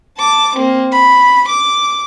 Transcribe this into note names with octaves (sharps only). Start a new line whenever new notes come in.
A5 D6
A#3 C4
B5
D6